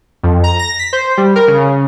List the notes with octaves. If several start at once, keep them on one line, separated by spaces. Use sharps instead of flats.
F2
A#5
A#6
B6
C5
G3
A#4
C#3
C#3